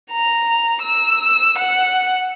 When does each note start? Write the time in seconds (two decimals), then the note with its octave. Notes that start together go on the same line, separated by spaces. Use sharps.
0.12 A#5
0.82 E6
1.58 F#5